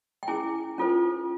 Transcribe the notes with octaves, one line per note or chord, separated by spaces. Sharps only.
G5
C#4 E4 G#4 G#5
C#4 F4 A4 C5